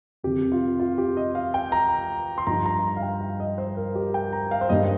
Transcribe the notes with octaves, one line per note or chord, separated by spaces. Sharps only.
F2 C3 D#3 G4
F4
F4
G4
D#5
F5
G5
A#5
C6
G2 F3 D#4 A#5
A#5
F5
G5
F5
D#5
C5
A#4
G4
G5
A#5
F5
C5
G2 D#3 G3 D#5